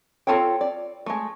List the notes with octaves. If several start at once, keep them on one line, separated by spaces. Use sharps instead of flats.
C4 F4 A4 C#5 G5
D5
G#3 A3